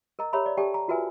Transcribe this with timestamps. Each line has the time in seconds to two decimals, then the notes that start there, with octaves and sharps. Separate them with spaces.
0.19 A#4 D#5 A#5
0.33 G4 A#4 C#5 E5 A#5 B5
0.45 C#5 D5
0.57 G4 A4 D5 E5 G5 A5
0.74 A#5
0.88 F4 F#4 A#4 B4 E5 G#5